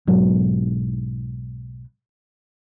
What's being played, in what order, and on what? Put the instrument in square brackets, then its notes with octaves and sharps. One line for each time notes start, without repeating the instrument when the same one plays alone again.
[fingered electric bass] B1 G#2 F#3 G#3